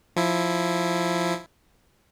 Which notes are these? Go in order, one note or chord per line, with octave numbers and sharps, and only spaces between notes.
F3 E4